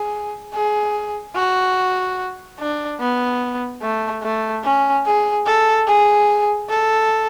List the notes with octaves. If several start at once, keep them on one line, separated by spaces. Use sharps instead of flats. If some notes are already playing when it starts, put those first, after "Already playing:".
Already playing: G#4
G#4
F#4
D4
B3
A3
A3
C#4
G#4
A4
G#4
A4